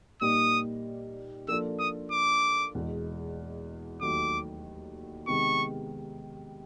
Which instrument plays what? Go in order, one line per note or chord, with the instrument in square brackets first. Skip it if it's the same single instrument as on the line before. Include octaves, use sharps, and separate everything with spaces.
[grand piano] A#2 G3 A#3 D#4 G4 [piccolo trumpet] D#6
[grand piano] F3 A#3 D4 F4 A4 [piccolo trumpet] E6
[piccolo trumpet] D#6
D6
[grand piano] E2 B2 G#3
[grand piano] D#2 D#3 F#3 A3 [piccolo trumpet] D6
[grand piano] C3 D#3 G#3 B3 [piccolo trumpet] C#6